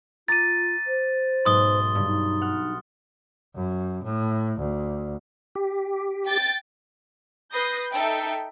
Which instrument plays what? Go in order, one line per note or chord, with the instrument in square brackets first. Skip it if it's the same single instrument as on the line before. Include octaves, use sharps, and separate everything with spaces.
[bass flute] F4 [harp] A#5 D6 [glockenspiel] A6 D#7
[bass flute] C5
[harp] B1 G#2 [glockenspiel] C6 D#6 G7
[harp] G2 [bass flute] C#3
[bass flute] D#4
[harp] F#5 F6
[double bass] F#2
A2
D2
[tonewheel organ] G4
[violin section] G5 A6
B4 D#6 G6 A#6 C7
D#4 A4 E5 G5